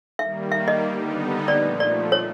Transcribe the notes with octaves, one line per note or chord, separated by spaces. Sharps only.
D#3 G3 A#3 E5
E5
D#5
D3 G3 B3 D#4
A#2 F3 A3 D5
D5
C#5